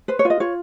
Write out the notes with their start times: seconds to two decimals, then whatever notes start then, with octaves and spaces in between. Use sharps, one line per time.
0.08 B4 C5
0.19 C#5
0.25 F4
0.30 D#5
0.40 F4 C#5